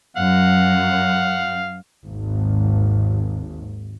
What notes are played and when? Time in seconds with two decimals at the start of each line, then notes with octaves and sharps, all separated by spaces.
0.17 F#2 F5 F#5
2.06 G#1 D#2